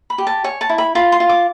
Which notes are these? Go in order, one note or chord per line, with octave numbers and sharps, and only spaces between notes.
B5
G4
A5
C#5 G#5
A5
E4
B5
F4 B5
C6
F4
D6